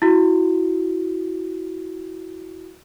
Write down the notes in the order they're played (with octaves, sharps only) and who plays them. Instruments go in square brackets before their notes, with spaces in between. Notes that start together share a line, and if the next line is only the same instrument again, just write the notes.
[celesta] E4 F#4